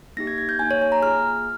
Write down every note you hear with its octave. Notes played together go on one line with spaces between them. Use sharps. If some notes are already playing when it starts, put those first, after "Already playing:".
A#3 D#4 G4 A#6
G#6
G#6
G6
A#3 D#4 G4 G#5
C#5
G#5
A#5
A#3 F4 G#4 F6